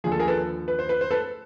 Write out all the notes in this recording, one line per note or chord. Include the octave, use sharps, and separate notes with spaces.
D#2 D3 F3 G#4
A4
G#4 A#4
A4 B4
B4
C5
B4
C5
A4 B4